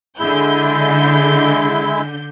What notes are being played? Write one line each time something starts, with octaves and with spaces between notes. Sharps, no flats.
D3 G#3 E4 G6